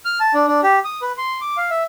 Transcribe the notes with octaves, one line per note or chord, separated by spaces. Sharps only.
F6
A5
D4
D4
G4
D#6
B4
C6
D6
F5
E5